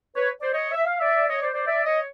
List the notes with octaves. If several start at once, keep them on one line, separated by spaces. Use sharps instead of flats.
B4 C#5
C5 D5
C#5 D#5
E5
F5
D5 E5
C#5 D#5
C5 D5
C5 D5
D5 E5
C#5 D#5